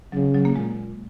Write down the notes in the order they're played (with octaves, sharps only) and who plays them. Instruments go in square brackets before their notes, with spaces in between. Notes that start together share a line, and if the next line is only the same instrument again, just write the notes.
[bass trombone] C#3 [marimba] F#3
[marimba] F#3
A#3
[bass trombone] A#2 [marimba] G#3